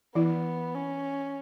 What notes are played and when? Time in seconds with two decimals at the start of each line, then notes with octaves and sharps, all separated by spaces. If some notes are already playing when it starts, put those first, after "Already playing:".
0.15 E3 B3 E4
0.75 C#4